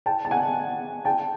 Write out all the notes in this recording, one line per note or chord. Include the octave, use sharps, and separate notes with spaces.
G5 A5
A5
F#5 G#5
G5 A5